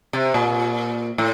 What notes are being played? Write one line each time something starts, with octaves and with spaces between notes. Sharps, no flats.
C3
A#2
A2